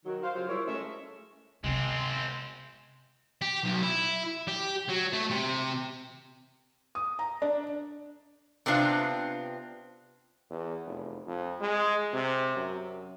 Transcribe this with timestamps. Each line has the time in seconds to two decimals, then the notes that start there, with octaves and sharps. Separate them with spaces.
0.05 D#3 F#3
0.23 C5 F5
0.35 C#3 F#3 F4 G4 C5
0.49 F3 G3 E4 A#4 C#5
0.67 G#3 A3 C#4 E5
1.64 C3 G#3 B3 C4
3.42 G4
3.64 B1
3.83 E4
4.48 G4
4.89 F#3
5.13 A3
5.30 C3
6.95 D#6
7.19 A#5
7.42 D4
8.66 C3 B3 C4 D4 F4
10.50 E2
10.86 F1
11.27 F2
11.60 G#3
12.13 C3
12.56 F#2